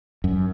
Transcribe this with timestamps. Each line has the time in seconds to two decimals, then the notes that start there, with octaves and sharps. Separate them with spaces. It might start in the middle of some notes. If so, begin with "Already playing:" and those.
0.24 F#2